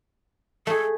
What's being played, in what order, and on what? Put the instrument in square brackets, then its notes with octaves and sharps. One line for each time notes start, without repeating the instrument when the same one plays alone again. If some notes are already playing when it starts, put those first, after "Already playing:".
[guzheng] A3 G#4 [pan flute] A4